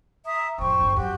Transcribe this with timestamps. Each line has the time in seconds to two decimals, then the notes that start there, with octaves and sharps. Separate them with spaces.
0.25 E5 A#5 D#6
0.58 A1 F2 C5 G5 C#6
0.81 G1 E3
0.96 F#2 F#4 G4 G5